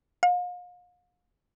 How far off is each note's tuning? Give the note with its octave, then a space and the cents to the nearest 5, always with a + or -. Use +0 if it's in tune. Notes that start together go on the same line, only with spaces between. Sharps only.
F5 +40